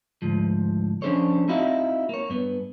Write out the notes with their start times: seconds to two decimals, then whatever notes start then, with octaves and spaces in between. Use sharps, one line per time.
0.22 D2 G#2 F3
1.02 F3 C#4 D4 A4 C5 C#5
1.48 C4 D#4 E4 F#4 D#5 F5
2.09 A#3 C#5
2.30 G2 B3